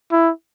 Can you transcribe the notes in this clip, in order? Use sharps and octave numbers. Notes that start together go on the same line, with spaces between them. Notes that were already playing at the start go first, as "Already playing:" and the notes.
E4